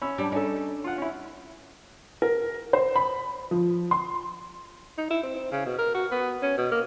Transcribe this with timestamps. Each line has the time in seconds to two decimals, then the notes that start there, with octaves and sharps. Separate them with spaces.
0.01 C#4 B5 E6
0.18 G3 D4
0.32 C#4 D#4 A4
0.84 F4 F#5
0.98 C#4 E4
2.22 A#4
2.73 C5
2.96 B5
3.51 F3
3.91 C6
4.98 D#4
5.10 E4
5.23 C4
5.36 C4
5.52 C#3
5.65 B2
5.79 A#4
5.94 F#4
6.12 B3
6.42 C#4
6.57 B2
6.71 A#3